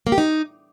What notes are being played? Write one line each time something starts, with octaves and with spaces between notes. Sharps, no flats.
A#3
G4
D#4